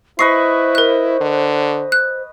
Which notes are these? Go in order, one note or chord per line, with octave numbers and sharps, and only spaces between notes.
E4 B4 C5 D#5 C#6 C7
A#4 F#6
D3
F#6